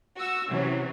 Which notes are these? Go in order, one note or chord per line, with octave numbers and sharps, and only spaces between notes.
F#4 E6
C3 E3 F#3 C#4